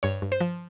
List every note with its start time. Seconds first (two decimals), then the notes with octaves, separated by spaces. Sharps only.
0.03 G2 C#5
0.22 G2
0.32 C5
0.41 F3